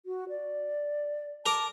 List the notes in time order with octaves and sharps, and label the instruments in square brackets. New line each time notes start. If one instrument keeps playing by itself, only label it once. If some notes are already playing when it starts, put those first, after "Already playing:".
[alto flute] F#4
D5
[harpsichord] A#4 A#5 D6 [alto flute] A5